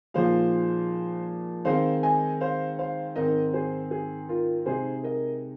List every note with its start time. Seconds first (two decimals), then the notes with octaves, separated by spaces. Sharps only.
0.14 A#2 F3 G#3 D#4 C5 F5
1.65 D#3 G#3 C4 D#4 C5 F5
2.03 D#5 G#5
2.41 C5 F5
2.79 C5 F5
3.16 G#2 D#3 C4 D#4 A#4 D#5
3.53 G#4 C5
3.91 G#4
4.29 F4 A#4
4.66 C3 G#3 D#4 G#4 C5
5.03 A#4 D#5